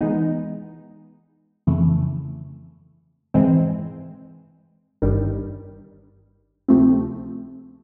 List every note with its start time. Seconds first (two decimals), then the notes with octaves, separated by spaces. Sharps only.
0.01 E3 G#3 B3 D#4
1.67 F2 C#3 E3 A3
3.34 G#2 E3 G#3 C4
5.02 G1 G2 D#3 G3
6.68 D2 C3 F3 A3 C4